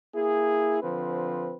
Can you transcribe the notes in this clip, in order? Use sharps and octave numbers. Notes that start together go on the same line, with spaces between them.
A#3 E4 G#4
D3 F3 C4 B4